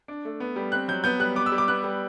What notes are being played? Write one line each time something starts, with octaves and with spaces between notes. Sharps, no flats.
D4
A3
B3
G3
C4 F#6
F#3 G6
B3 G6
G3 F#6
B3 D6
E6
G3
D6
B3 F#6
G3